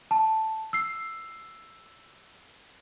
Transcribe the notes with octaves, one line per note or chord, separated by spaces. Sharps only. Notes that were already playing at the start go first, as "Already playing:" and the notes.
A5
E6 C7